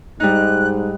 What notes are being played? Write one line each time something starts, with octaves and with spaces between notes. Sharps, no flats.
G#2 G3 D#4 F#6